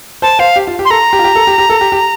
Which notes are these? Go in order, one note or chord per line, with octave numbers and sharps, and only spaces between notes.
C5 A5
C5 F5
G4
F4
G4
C6
A4 A#5
G4
F4
G4
A4
G4
G4
A4
G4
G4